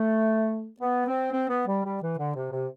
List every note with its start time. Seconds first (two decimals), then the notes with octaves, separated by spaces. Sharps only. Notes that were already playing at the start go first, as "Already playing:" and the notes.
Already playing: A3
0.80 B3
1.06 C4
1.32 C4
1.48 B3
1.67 G3
1.84 G3
2.01 E3
2.17 D3
2.35 C3
2.52 C3